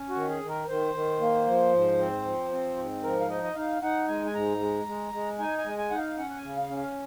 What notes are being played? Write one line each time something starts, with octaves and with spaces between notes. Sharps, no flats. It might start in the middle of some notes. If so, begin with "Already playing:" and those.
Already playing: C#4
F#4
D#3
G#4
D#3
A#4
D#3 C5
D#3
A#3
F3
G#2
C4
F3
C4
G#2
F3 A#4
F5
D#4 D#5
D#5
D#4 F5
D#4 F#5
G#3 G#5
G#5
G#2 A#5
G#3
G#3
G#3
D#4 G#5
G#5
G#3
G#5
D#4 F#5
F5
C#4 F#5
F#5
G#5
C#3
F5
C#4
F5